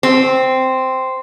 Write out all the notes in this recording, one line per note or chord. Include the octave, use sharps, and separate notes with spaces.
C4